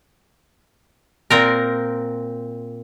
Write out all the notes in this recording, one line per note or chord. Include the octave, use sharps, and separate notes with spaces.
A#2 C4 A#4